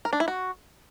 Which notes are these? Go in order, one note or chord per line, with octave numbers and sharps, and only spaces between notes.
A#4
D4
E4
F#4